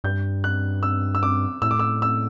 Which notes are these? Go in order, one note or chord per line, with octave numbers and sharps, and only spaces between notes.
G2 G6
F#6
E6
E6
D6
A2 E6
D6
E6
E6